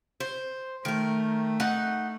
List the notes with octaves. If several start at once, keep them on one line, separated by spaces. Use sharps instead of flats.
C5
D#3 A3 A#4
D#4 F#5